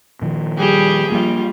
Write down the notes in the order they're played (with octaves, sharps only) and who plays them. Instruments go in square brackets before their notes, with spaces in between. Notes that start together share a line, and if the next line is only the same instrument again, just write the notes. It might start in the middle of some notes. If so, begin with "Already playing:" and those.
[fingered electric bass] A#2 D#3 F3
[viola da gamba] G3 G4 G#4
[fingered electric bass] F3 A#3 [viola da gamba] G3 F4